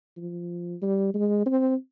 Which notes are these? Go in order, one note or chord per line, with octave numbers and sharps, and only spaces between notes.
F3
G3
G#3
C4